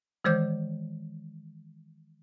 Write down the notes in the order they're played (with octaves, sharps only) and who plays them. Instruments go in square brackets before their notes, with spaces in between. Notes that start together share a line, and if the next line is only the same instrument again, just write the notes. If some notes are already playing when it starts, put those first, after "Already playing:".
[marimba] D#3 E3 G#3 C5 D6 G6